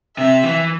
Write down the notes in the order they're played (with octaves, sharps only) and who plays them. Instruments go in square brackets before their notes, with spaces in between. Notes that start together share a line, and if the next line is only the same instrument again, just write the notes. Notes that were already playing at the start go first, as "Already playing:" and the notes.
[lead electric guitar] C3 [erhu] E5
[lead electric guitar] E3